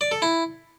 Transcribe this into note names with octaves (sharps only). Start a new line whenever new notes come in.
D5
A4
E4